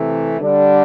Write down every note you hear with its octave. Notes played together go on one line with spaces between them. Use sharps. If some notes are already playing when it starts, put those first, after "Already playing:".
Already playing: C3 E3 A3
D3 G3 D4